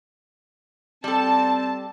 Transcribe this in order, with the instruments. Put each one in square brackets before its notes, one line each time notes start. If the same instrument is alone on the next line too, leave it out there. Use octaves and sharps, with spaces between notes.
[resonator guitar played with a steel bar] G3 A4 [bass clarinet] C4 [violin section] A5